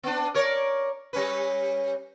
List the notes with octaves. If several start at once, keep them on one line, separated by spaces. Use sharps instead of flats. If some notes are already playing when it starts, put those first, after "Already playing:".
B3 D4
A#4 C#5 D5
G3 C#4 B4